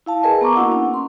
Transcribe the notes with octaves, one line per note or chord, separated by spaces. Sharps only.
E4 F5 A5
G#4 A#4 B4 D#5 G#5
B3 A#5 C#6 D6
A#3 D4 E4 F#4 F#5
C#4 D4 F#5
C6